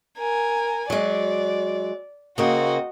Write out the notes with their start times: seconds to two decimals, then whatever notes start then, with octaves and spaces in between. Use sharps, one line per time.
0.18 A#4 G#5
0.90 F#3 G#3 D5
2.38 C#3 A#3 C4 F#4 D#5